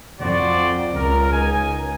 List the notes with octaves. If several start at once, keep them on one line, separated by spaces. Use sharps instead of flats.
F2 F#4 C5 D5
C#2 A#4
D#4 G#5